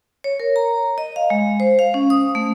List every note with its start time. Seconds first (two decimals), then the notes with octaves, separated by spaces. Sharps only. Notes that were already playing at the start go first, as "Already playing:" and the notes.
0.24 C#5
0.40 A#4
0.56 A#5
0.98 D#5
1.16 F5
1.30 G#3
1.60 C5
1.79 F5
1.94 C#4
2.10 D#6
2.35 A3